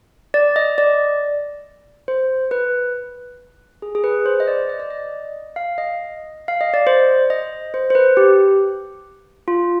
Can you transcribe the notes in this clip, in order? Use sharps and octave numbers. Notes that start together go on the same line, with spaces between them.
D5
D#5
D5
C5
B4
G#4
G#4
B4
C5
D#5
D5
D#5
D5
D#5
F5
D#5
F5
D#5
D5
C5
D#5
C5
C5
B4
G4
F4